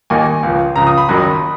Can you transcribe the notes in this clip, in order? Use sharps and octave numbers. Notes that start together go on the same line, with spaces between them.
D#2 D#3 A#3 D#4 G#5
C#2 C#3 F3
C#2 C#3 F3 A#5
D#6
B5
F#1 F#2 D#3 F#3 B5